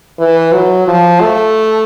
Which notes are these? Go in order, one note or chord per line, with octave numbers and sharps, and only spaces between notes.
E3
F#3
F3
A3